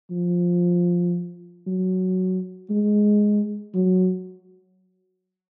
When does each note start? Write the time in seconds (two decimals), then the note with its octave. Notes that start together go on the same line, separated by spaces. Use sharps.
0.10 F3
1.67 F#3
2.70 G#3
3.75 F#3